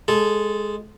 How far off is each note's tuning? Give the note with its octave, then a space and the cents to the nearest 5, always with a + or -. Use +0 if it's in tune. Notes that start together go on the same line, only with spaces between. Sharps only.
G#3 +0 A4 -15